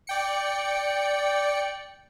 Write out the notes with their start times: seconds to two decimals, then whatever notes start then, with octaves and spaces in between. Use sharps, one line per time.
0.07 D5 G5 C#7